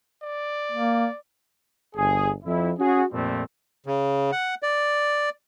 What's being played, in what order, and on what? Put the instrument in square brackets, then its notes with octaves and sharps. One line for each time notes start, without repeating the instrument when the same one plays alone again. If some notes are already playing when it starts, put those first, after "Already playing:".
[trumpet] D5
[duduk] A#3
[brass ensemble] G1 G#4
F2 E4
C#4 F#4 G#4
F2 A#2 G3 A3 C4
[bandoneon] C#3
F#5
D5